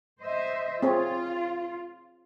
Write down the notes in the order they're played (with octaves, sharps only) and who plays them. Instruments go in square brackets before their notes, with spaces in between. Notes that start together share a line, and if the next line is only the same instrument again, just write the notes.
[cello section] C5 D#5 E5
[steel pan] C4 G#4 C#5 [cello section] F4